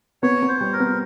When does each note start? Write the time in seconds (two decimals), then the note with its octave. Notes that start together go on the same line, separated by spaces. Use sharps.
0.23 B3 C#5
0.42 B3
0.48 C5
0.61 G3
0.73 A#4
0.80 B3